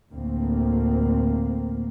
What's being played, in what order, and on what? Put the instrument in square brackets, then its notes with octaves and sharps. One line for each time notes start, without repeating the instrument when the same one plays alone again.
[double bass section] D2 A2 A#3 C4